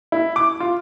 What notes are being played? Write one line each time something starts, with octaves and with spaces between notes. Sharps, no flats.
E4
D6
F4